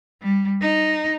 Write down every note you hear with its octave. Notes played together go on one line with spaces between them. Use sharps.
G3
D#4